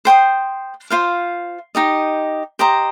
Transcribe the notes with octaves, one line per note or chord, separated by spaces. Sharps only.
C5 G5 C6 D#6
F4 C5 F5
D#4 G4 D#5
G4 C5 D#5 A#5